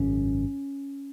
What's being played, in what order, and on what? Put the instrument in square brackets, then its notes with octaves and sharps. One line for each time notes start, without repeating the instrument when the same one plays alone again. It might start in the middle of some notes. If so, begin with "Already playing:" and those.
Already playing: [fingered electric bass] G#1 F#2 C#3 C#4